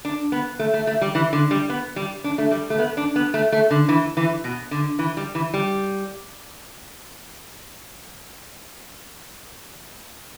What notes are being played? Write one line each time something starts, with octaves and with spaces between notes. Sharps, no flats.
D4
B3
A3
A3
A3
G3
E3
D3
G3
B3
G3
D4
A3
G3
A3
B3
D4
B3
A3
A3
D3
E3
E3
B2
D3
E3
G3
E3
G3